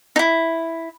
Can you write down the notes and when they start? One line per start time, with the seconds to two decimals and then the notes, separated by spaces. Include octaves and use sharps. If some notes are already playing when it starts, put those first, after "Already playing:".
0.16 D#4 E4